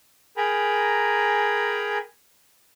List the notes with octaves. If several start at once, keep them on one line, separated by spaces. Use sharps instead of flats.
G#4 A#4 G5 G#5 A#5 B5